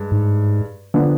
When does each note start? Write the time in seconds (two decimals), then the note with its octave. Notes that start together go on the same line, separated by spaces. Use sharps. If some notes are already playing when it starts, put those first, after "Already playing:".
Already playing: G2 G#3
0.11 G#2
0.94 D3 F3 B3 D4